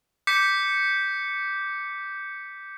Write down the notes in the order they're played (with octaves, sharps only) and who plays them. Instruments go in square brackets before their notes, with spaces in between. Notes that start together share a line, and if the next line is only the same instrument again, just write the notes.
[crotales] D6 G6 B6 C#7